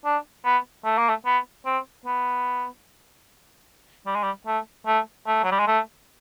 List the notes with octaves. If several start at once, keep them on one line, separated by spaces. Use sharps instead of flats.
D4
B3
A3
A#3
A3
B3
C4
B3
G3
G#3
G3
A3
A3
A3
F#3
G3
G#3
A3